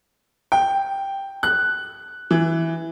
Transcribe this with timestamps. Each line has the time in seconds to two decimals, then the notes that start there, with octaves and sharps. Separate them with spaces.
0.52 G5
1.43 F#6
2.31 E3